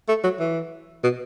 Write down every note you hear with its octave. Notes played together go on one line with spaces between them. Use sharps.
A3
F#3
E3
B2